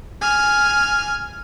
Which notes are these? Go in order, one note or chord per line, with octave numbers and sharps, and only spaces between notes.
G#5 F6